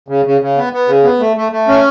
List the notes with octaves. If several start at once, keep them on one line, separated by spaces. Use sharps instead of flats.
C#3
C#3
C#3
B3
B3
C#3
B3
A3
A3
A3
C#4